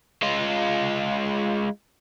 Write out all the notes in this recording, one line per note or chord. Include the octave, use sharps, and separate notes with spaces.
G#3 F4